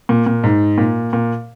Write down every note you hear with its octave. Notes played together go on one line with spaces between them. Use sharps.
A#2
A#2
G#2
A#2
A#2